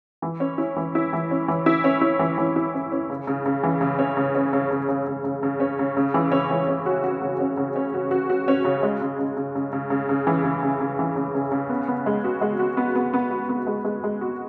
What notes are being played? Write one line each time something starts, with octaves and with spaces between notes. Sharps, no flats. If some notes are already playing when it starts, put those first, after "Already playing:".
E3
C#4
E4
E3
E4
E3
C#4
E3
E4
C#4
E4
E3
E3
E4
C#4
C#4
C#3
C#3
C#3
E3
C#3
C#4
C#3
C#4
C#3
C#3
C#3
C#3
C#3
C#3
C#4
C#3
C#3
E3
C#4
E3
C#4
F#4
F#4
C#3
C#4
C#3
C#4
F#4
F#4
F#4
C#4
C#3
G#3
C#3
C#3
C#3
C#3
C#3
C#3
C#3
E3
C#3
C#3
C#3
E3
C#3
C#3
C#3
B3
B3
G#3
F#4
G#3
F#4
B3
B3
B3
F#4
B3
G#3
G#3
G#3
F#4